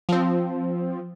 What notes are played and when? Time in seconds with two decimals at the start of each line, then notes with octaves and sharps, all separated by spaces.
0.09 F3 C4